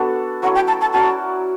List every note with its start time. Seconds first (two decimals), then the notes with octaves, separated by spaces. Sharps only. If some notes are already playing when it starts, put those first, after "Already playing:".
Already playing: B3 D4 F#4 A4
0.42 F#3 A3 C#4 E4 F#5
0.55 G5
0.68 A5
0.81 A5
0.93 C#4 F#4 A#4 D5 A5